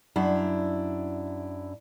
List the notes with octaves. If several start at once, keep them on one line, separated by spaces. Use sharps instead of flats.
F#2 D4 E4